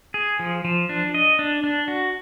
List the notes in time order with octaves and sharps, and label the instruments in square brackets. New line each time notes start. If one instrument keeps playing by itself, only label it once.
[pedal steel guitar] G#4
F3
F3
D4
D#5
D4
D4
F#4